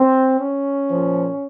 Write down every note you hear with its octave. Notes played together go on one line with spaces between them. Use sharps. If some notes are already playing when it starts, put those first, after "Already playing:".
Already playing: C4
C#4
A#2 F3